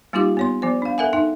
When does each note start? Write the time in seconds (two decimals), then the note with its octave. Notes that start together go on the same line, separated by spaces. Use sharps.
0.13 G3 A#3 D#4 F4 G4 D6
0.37 B3 C#5 C6
0.62 F3 B3 C5
0.82 D4 F5
0.98 A4 A#4 E5 F#5 G#5
1.13 D#4 A4 E5 G5